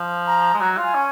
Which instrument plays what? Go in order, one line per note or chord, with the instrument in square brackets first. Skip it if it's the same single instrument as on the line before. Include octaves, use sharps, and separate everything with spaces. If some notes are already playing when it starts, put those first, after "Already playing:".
Already playing: [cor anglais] F3
[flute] A#5
[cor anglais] G#3
[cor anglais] F#3 [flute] A#5
[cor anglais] F4
[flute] G#5
[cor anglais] C#4